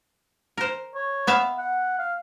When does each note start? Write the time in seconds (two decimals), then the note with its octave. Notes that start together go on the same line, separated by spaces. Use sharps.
0.58 A#4 C5
0.95 C#5
1.27 B3 E5 F5
1.58 F#5
1.99 F5